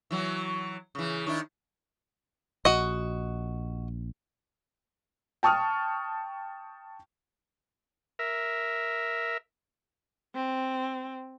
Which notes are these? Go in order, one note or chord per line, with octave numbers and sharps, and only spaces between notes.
E3 F#3
C#3 E3
D#3 D4 E4
A#1 F#4 D#5
G5 A5 C#6 D#6 F6
A#4 E5
C4